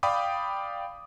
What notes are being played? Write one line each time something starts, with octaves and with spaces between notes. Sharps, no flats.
D5 F5 G5 B5 D6 D#6